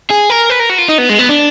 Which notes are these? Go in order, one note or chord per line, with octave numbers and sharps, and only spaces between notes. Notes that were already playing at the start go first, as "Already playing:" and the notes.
G#4
A#4
B4
A#4
F#4
F4
D#4
B3
G#3
B3
D4